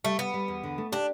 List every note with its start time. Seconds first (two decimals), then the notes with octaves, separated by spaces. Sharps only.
0.04 G3 A3
0.19 G3 B3
0.34 G3
0.48 E2
0.63 D3
0.78 A3
0.92 D4 G4